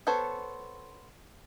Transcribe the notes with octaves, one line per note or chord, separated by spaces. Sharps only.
B3 A4 C5 C#5